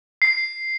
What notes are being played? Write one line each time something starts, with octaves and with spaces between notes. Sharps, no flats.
C7